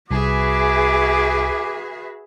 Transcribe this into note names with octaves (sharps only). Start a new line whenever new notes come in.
C2 F#4 G#4 B4 E5 G#5 D6